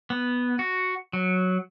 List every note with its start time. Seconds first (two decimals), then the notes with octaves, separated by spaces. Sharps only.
0.10 B3
0.59 F#4
1.13 F#3